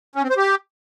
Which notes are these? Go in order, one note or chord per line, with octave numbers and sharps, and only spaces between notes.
C#4
C4
C5
G4